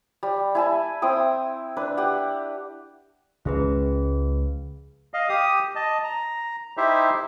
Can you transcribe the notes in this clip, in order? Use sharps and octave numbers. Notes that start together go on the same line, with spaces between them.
G3
E4 G#5 A5
C4 E4 G5 D#6
D4 B4
G4 F#5
C#2 F3 G#3 C#4 G#4 B4
D#5 F5
G4 D#6
D#5 A5
A#5
D#4 E4 G4 C5 E5